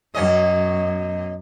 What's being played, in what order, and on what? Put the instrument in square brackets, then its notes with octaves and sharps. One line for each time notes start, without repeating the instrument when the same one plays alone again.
[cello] F#2 [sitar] B2 C#4 D#5